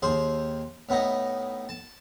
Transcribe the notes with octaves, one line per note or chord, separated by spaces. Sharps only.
D#2 G#4 C5 C6
A2 B3 D#4 D#5
A5